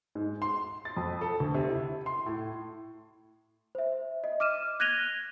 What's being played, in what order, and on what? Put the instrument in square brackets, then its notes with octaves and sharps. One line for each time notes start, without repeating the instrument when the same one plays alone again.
[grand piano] G#2
C6
A6
F2
A4
D2
C3
E4
C6
A2
[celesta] C5 E5
D#5
D6 F6 D#7 E7
F#6 G#6 A#6 D#7 F7 G7